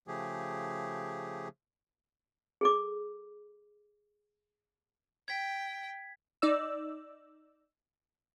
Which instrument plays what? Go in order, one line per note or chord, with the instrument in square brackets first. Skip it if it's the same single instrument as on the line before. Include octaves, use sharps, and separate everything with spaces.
[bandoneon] C#3 F3 A3 G4 G#4
[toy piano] G#4 A4 D6
[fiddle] G5 [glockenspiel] G#6 B6
[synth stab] D#4 D5 E6